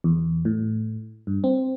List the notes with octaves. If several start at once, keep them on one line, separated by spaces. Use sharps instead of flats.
E2
A2
G2
C4